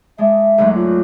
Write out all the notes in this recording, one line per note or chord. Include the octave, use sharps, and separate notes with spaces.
G#3 D4 E5
D2 G#2 F#3
F4